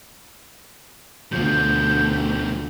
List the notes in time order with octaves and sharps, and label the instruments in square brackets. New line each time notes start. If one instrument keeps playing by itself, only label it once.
[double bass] D2 [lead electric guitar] B2 F3 [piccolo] G6